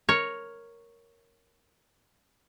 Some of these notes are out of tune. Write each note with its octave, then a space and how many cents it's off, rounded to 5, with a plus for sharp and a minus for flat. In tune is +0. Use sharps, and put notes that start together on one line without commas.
A#4 +0 C#5 +0